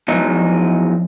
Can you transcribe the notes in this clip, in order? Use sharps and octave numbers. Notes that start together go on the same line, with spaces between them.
E2 F3 F#3 G#3 D#4